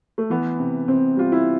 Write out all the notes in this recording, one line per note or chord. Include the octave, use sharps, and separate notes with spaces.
A3
E3 B3
C3
C3 C4
G3 F4
E4